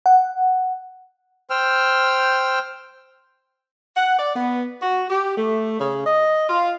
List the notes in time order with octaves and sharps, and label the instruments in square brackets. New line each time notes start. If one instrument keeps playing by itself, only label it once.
[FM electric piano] F#5
[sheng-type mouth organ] C5 G5 E6 F6
[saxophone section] F#5
D5
B3
F#4
G4
A3
C#3
D#5
F4